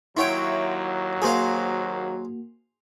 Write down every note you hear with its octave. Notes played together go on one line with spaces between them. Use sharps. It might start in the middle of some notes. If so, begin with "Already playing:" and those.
D#2 F#3 E4 C#5 E5 F#5 G5 C6
A#3 F#4 G#4 C5 F5